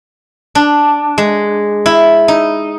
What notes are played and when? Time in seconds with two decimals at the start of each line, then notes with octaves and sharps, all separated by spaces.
0.55 D4
1.18 G#3
1.86 E4
2.28 D#4